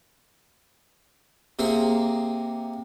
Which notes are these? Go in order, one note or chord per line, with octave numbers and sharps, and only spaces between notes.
C3 A#3 G#4